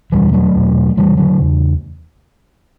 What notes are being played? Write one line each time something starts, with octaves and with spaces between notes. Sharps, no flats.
E2 B2 E3 G3
F#3 A3
E2 B2
E2 C#3 E3 G3
D3 F#3
E2 C#3